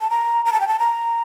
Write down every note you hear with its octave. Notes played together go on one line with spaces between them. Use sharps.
A5
A#5
A#5
A5
G5
A5
A#5